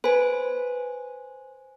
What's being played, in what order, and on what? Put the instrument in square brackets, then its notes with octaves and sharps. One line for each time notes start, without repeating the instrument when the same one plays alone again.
[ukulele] B4 [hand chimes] C5 G#5